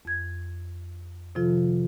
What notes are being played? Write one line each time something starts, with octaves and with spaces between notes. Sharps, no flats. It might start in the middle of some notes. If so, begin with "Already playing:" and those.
F2 G#6
C3 D#3 F3 F4 A4